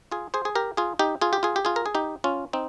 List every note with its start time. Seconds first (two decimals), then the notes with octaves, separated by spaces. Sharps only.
0.11 F4 G#4
0.34 G#4 C5
0.45 G#4
0.55 G4 A#4
0.77 F4 G#4
0.99 D#4 G4
1.21 F4 G#4
1.33 G4
1.43 F4 G#4
1.56 G4
1.65 F4 G#4
1.76 A#4
1.86 G#4
1.95 D#4 G4
2.24 C#4 F4
2.53 C4 D#4